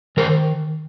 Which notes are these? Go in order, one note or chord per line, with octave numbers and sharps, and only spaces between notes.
D#3 A#4 C5